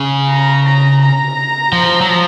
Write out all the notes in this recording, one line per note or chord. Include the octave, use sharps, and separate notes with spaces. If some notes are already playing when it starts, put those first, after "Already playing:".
Already playing: C#3
A#5
A#5
A#5
F3
F#3
F3